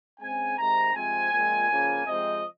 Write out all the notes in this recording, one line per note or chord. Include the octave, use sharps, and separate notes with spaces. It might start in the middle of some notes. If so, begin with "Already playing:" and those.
C#3 G#3 C4 G#5
C3 D#3 G#3 C4 A#5
C3 F3 G#3 C4 G#5
A#2 F3 G#3 C4
C#3 F3 A#3
C3 F3 G#3 C4 D#5